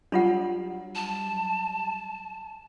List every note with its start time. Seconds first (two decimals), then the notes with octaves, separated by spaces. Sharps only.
0.12 F#3 G3 D4 F4 F#5
0.95 A5